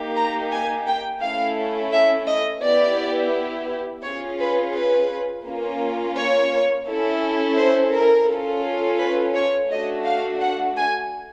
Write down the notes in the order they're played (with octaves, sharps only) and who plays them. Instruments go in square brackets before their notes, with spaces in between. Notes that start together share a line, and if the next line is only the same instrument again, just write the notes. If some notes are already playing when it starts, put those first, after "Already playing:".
Already playing: [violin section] A#3 D#4 G4
A#5
G#5
G5
A3 C#4 E4 A4 F5
E5
D#5
B3 E4 G4 D5
C#4 F4 G#4 C#5
B4
B4
A#3 C#4 F4
C#5
C#4 E4 A4
C5
A#4
C#4 F4 A4
B4
C#5
A3 D4 F#4 D#5
F5
F#5
G#5